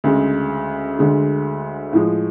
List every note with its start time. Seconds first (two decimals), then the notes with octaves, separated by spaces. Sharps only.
0.04 D2 C#3 G#3
0.99 D2 D3 G#3
1.93 A2 F3 G#3